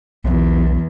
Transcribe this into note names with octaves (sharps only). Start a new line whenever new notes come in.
B1 E2